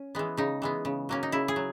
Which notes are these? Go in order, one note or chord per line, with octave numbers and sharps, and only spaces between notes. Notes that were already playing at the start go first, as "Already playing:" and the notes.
Already playing: C#4
E3 G#3 B3
C#3 D#4
E3 G#3 B3
C#3
F#3 A#3 C#4
D#4
C#3 E4
G#4
F#3